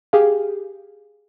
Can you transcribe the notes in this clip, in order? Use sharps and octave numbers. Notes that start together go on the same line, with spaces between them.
G4 G#4 F5